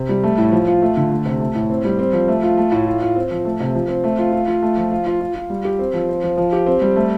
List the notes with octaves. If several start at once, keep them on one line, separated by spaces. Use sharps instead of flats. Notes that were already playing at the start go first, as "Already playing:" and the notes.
Already playing: C3
G3
A3
A2
F3
F4
A3
D3
A3
C3
A3
A2
C4
G3
C4
F3
A3
F4
A3
A2
F4
F4
C4
F3
A3
C3
F3
C4
A3
F4
F4
F4
A3
F3
F4
F4
F4
F4
G3
G4
C4
F3
C4
F3
F3
G4
C4
G3
A3